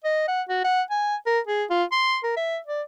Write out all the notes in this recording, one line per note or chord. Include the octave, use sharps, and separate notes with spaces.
D#5
F#5
F#4
F#5
G#5
A#4
G#4
F4
C6
A#4
E5
D5